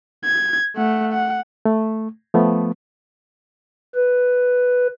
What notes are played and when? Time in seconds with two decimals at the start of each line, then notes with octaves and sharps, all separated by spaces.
0.25 G#6
0.76 A3 F#5
1.13 F#5
1.65 A3
2.34 F3 A3 B3
3.96 B4